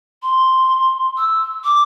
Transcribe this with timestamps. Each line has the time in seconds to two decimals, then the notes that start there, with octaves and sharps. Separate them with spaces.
0.23 C6
1.17 E6
1.64 D6